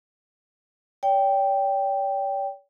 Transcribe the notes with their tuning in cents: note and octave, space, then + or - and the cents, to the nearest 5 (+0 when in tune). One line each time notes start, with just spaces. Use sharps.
C#5 +45 G5 +0